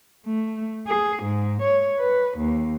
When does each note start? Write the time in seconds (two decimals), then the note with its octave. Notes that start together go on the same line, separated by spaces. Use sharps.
0.25 A3
0.87 G#4
1.22 G#2
1.62 C#5
1.99 B4
2.37 D#2